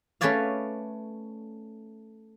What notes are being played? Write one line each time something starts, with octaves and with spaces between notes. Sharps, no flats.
A3 C#4 B4 C#5 D5 F5